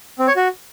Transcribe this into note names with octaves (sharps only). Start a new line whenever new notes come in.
C4
C#5
F#4